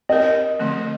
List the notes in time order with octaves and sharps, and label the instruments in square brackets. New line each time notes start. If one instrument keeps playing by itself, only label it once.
[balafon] C4 G4 A#4 [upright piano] D#5
[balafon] D3 F3 A3 C4